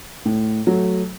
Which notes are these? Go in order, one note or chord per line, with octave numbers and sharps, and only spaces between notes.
A2
F#3 A3